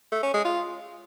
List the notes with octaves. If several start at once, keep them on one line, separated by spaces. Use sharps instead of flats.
A3
C#4
G#3
F4